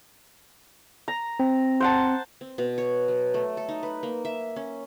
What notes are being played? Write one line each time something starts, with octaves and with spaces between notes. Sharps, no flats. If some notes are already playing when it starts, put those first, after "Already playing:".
A#5
C4
C5 F#5 A5
C4
B2
C#5
F#3
A3
A4
D#4
B4
A#3
E5
C#4